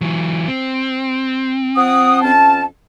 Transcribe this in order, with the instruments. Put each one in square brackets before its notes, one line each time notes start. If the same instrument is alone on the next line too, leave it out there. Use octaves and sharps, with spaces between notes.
[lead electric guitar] E3 F#3
C4
[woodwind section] F3 F#5 D#6
F2 C#4 A5